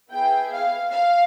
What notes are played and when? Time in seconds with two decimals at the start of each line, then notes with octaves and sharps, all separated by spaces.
0.11 B3 E4 G#4 G5
0.52 F5
0.92 F5